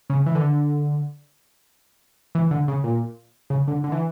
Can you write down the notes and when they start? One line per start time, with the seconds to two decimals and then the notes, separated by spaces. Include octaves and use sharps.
0.10 C#3
0.26 E3
0.35 D3
2.35 E3
2.51 D3
2.68 C#3
2.84 A#2
3.50 C#3
3.68 D3
3.84 D3
3.92 E3